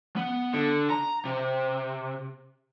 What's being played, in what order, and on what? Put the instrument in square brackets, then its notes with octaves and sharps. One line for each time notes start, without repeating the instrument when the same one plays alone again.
[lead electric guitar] B3
D3
A#5
C3